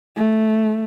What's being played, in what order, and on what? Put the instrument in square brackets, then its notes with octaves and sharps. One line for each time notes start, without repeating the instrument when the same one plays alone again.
[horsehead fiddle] A3